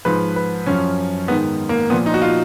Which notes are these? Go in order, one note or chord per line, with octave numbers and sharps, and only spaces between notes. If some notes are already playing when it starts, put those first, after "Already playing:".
G#2 F3 B4
B4
F#2 F3 C#4
G#2 D#3 B3
A#3
A#2 F3 B3
D#4
F#4
F4